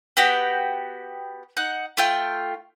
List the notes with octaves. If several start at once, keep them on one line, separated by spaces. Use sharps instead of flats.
B3 F#4 G4 G5
D#4 F#5 F#6
A3 F4 G5